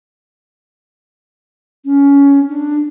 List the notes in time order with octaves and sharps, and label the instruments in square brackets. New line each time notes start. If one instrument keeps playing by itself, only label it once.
[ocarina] C#4
D4